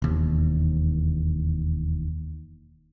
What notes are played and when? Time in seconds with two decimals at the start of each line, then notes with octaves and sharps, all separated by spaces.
0.02 E1 D#2